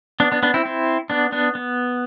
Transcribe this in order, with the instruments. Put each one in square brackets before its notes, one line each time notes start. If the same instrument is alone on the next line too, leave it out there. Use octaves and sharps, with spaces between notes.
[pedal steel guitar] B3 D4
B3 D4
B3 D4
C4 E4
C4 E4
B3 D4
B3 D4
B3